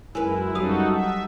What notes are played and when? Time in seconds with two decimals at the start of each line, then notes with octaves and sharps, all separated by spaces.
0.15 F#2 G#3 E4 A#4 B4 E6
0.55 F#3 G3 D#4 F#4 A4 F5 D#6
0.89 E5